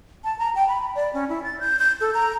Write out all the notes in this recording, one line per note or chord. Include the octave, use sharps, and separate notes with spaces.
A5
A#5
G5
B5
D5
C#4
E4
A6
G6
G6
A4
A#5